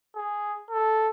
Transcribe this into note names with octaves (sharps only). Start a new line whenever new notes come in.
G#4
A4